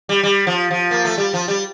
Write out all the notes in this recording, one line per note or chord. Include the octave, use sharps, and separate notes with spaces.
G3
G3
F3
F3
A#3
A3
G3
F3
G3